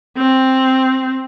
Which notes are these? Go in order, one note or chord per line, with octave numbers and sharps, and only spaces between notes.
C4